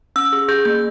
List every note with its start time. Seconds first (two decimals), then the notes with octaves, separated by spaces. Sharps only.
0.16 C#4 E6
0.33 G#4
0.49 G#4 G6
0.65 A#3 G6